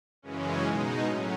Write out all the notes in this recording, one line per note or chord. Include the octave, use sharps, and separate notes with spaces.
F#2 C#3 E3 G#3 C#4
B2 G#3 D#4
A2 F#3 C#4